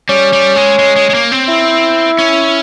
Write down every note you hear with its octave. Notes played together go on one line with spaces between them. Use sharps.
G3 C#4
G3
G#3
G#3
G#3
G#3
A#3
C4
E4
C#4